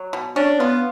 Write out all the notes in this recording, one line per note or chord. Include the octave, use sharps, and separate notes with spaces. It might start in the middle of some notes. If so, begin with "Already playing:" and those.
Already playing: F#3
B2
C#4 D4
B3 F4